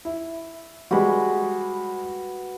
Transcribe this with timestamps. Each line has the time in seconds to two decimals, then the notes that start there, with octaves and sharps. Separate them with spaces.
0.05 E4
0.91 G3 G#3 F#4 G4 B4